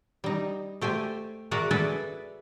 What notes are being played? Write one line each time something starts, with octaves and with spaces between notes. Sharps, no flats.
G3 D#4
A3 G4 C5 G#5
F#4 G#4 A#4 D5 E5 F#5
G#4 A4 B4 D5 E5 F#5